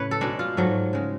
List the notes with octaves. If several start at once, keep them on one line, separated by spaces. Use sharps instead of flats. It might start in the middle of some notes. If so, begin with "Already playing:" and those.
Already playing: A2 C#3 B4 C#5
A4
B2 G#3 D4
F4
G#2 F#3 A3
C#3 G#3